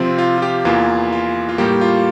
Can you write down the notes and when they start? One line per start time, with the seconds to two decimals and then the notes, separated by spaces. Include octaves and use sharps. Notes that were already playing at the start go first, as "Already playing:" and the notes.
Already playing: C3 F3 C4 F4
0.18 F4
0.38 F4
0.42 G4
0.65 E2 E3 A#3 F4
1.13 F4
1.49 F4
1.58 A2 G3 A#3 G4
1.81 F4